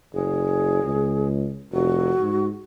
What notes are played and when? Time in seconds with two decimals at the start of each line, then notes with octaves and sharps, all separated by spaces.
0.13 F#1 G#4
0.83 C#2
1.72 F1 F#4
2.20 G#2